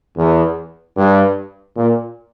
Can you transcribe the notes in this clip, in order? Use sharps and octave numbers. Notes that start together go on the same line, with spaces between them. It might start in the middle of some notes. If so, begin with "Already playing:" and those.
E2
G2
A#2